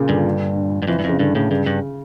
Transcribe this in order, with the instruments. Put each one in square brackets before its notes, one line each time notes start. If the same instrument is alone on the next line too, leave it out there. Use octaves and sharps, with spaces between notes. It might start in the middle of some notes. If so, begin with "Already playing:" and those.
Already playing: [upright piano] A#2 C#3
[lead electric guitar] G2 [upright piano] D3
[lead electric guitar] G2
[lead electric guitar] F2 [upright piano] E3
[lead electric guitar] G2
[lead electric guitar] F2 [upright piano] C#3
[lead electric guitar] G2 [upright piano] D3
[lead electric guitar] A2 [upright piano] C#3
[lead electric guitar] G2 [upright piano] C#3
[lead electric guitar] G2